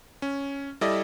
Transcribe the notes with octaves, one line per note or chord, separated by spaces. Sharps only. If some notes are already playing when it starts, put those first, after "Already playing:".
C#4
G3 E4 A4 D5 D#5